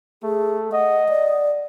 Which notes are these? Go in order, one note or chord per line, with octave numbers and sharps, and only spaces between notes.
A3 G#4
D#5 F#5
D5